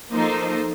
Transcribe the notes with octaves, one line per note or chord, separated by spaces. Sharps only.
F3 A#3 D#4 A4 C5